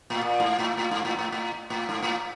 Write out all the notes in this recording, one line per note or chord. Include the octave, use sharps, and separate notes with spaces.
A2
A#2
G#2
A2
A2
G#2
A2
A2
A2
A2
G#2
A2